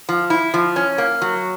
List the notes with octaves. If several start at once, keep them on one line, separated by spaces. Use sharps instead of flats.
F3
E4
F3
C#4
A#3
F#3